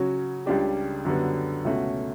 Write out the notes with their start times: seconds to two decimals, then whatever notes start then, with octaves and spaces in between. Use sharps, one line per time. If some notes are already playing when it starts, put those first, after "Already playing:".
Already playing: C#3 F#3 C#4 F#4
0.46 C#2 C#3 G3 D4 G4
1.05 F#2 D3 G3 B3
1.65 C#2 B2 A3 C#4 F#4